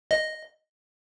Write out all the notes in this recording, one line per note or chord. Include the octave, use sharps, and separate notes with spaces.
D#5